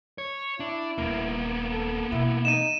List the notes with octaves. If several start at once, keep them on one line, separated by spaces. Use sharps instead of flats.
C#5
D4 E4
D#1 A#3 B3
A4
B2 E3 E4
D#4 D#7 E7